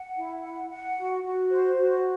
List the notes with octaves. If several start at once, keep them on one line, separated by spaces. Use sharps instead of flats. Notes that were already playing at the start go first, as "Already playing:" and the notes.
Already playing: F#5
E4
F#5
F#5
F#4
F#4
C5
F#4